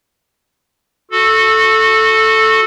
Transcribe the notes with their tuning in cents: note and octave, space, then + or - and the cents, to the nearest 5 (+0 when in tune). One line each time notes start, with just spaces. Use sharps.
F#4 -20 A4 +0